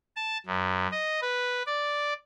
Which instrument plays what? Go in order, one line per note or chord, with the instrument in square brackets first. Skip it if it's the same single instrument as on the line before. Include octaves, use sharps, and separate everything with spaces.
[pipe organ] A5
F#2
D#5
B4
D5